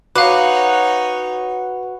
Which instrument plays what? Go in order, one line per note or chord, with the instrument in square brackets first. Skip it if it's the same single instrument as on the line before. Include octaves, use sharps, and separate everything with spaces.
[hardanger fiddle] D#4 C#5 [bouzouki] F#4 [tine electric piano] B4 [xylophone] F5 D6